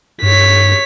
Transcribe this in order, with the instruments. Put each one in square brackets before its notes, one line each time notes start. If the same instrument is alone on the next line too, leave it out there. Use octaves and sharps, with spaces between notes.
[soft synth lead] G2 [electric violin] C#5 B6